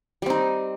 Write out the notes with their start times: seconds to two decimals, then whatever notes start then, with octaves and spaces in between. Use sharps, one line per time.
0.22 G3
0.26 C4
0.30 D#4